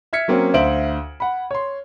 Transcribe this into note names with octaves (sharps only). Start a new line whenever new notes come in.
E5 F6 G#6 B6 C#7
F#3 A#3 C4 C#4
D2 C5 E5 F5 D7 F#7
F#5 B5
C#5 C6